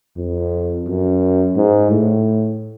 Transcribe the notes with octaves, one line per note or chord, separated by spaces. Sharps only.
F2
F#2
G#2
A2